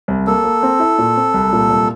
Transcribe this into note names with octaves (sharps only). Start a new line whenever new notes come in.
C2
A#3 A4
A#3
C4
E4
A#2
C4
C2
A#2
C2